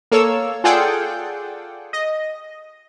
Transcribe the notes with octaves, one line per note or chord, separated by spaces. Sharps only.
A#3 A4 C#5 E6
F4 G#4 A4 D5 F#5 G5
D#5